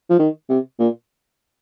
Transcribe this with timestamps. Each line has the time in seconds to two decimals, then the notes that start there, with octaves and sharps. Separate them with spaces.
0.10 F3
0.19 D#3
0.49 C3
0.79 A#2